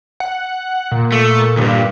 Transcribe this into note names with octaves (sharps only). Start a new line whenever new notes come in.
F#5
A#2
A3
D2 G2